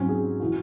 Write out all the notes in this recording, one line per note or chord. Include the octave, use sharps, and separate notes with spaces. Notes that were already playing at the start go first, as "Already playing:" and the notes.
Already playing: G#2 F#3 C4 C#4
G#4
E3 F#4